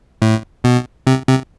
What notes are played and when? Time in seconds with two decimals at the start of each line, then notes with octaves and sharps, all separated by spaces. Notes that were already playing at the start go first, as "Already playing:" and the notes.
0.22 A2
0.64 B2
1.07 C3
1.28 C3